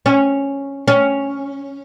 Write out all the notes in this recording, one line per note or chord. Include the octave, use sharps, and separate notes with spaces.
C#4
C#4